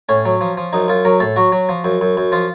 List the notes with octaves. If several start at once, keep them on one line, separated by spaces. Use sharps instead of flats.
A2 C#4
F#3
F3
F3
F#2 D#4
F#2 F4
F#3 A#4
A2 A4
F#3 F#4
F#3
F3
F#2
F#2
F#2
F3 F4